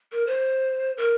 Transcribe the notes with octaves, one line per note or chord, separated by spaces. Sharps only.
A#4
C5
A#4